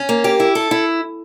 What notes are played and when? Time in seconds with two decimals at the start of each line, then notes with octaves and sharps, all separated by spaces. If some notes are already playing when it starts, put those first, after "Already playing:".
Already playing: C#4
0.09 A#3
0.24 G4
0.40 E4
0.55 A4
0.71 E4